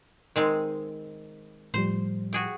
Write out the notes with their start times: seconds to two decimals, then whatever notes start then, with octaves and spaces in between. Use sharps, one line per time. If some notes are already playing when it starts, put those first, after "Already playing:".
0.36 D#3 G#3 C4
1.74 A2 F3 G3 C5
2.33 F#4 G#4 G5